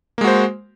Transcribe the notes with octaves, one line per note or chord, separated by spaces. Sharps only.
G#3 A#3 F#4 C5